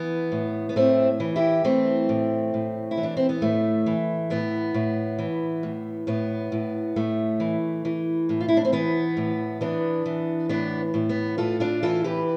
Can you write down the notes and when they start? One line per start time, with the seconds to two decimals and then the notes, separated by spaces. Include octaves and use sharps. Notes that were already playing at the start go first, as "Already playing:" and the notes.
Already playing: E3 B3
0.32 A2
0.69 B3
0.76 A2 A3 C4
1.20 E3
1.36 E4 G4
1.64 E3 A3 C4
2.09 A2
2.54 A2
2.91 E4
2.97 E3
3.03 D4
3.17 C4
3.29 B3
3.42 A2 A3
3.86 E3
4.30 A2 B3
4.74 A2
5.19 E3
5.63 A2
6.07 A2 B3
6.52 A2
6.96 A2 A3
7.40 E3
7.85 E3
8.29 A2
8.40 F4
8.48 E4
8.57 D4
8.65 C4
8.72 E3 B3
9.17 A2
9.61 E3 B3 D4
10.06 E3
10.49 A2 B3 D4
10.94 A2
11.09 B3
11.38 A2 F4 A4
11.60 D4 F4
11.83 E3 F4 A4
12.04 G4 B4